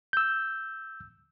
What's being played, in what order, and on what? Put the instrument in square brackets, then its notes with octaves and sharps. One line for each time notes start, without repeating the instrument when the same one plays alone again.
[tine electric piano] E6 G6